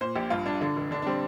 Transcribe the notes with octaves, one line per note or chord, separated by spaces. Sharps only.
A#2 C5
A#1 G4
G2 F4
G2 D4
D3 D4
F1
D3 D4
D4
G3 C4